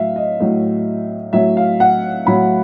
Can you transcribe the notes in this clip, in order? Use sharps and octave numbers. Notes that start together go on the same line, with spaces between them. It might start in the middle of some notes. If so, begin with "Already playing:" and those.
Already playing: A2 F#3 E5 F5
D#5
A2 F#3
A2 F#3 E5
F5
F#5
A2 F#3 B5